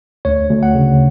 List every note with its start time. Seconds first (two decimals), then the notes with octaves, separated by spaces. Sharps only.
0.25 D2 C#5
0.50 D2
0.63 F#5
0.75 C#3